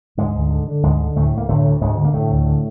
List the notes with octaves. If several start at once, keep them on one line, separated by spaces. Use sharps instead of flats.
D2 G#2 G#3
D2
D3
D3
D2 G#2 G#3
D3
D2 A2 A3
D2 A#3
A2 D3 A3
D2
D2 G#2 G#3
D3
A#3
A2 D3 A3
D2
D3